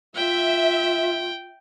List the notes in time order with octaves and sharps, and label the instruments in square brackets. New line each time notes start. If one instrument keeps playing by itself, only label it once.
[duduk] F4 [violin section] E5 [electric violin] G5